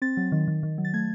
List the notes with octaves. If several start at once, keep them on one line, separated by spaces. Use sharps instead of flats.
C4 A6
F#3
D#3
D#3
D#3
F#3
A6
A3 G#6